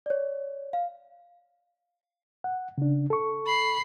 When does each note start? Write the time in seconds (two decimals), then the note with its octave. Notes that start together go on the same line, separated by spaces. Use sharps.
0.06 C#5 D5
0.73 F5
2.44 F#5
2.78 C#3 D4
3.10 A4 C#6
3.46 B5 C7